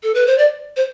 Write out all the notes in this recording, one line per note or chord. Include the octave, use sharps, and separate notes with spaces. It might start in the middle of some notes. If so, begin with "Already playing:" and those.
A4
B4
C5
D5
C5